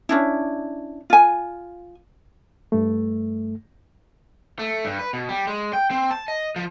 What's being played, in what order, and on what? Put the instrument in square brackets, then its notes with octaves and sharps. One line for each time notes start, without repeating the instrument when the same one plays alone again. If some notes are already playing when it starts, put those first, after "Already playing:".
[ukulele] C#4 D4 E4
F4 G#5
[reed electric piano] G2 A3
[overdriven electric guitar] A3
G2
B4
B2
G3
G#3
G5
C4
A5
D#5
F3